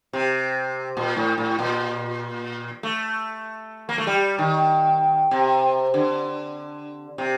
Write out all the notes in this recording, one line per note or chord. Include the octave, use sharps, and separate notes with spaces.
C3
A#2
A2
A2
A#2
A3
A#3
A3
G3
D#3
C3
D3
C3